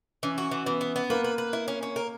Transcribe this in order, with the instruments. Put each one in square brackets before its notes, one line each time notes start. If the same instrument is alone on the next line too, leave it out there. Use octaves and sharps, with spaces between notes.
[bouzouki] E3 [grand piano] C#4
[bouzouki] F#4
E3
[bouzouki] E3 [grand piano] B3
[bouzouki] B3
B3
[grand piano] A#3 [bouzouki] B4
[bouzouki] B4
B4
E4
C#4
C#4
A#4